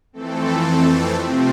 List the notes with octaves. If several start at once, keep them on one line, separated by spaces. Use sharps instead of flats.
F2 E3 A3 C4 A4
C3 F3 A3 C4